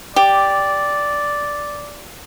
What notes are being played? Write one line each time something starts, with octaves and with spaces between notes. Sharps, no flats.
G4 D5